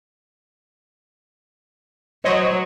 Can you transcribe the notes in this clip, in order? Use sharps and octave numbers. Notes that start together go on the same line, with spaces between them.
F#3 C5 C#5 D#5